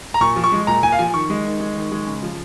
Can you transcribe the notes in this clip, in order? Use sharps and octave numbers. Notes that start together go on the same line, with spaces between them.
A#5
A#2 C#6
F3
C#6
G#3
A#2 A#5
A#2 G#5
F5
F3 G#5
D#3 C#6
G#3
D#3
G#3
D#3
G#3
C#3
F3